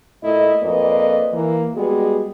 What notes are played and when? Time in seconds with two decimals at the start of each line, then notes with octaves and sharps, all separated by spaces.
0.23 A#2 A3 E4 D#5
0.63 F2 A#3 B4 D5 D#5
1.33 E3 A#3
1.75 G3 G#3 B3 F#4 G#4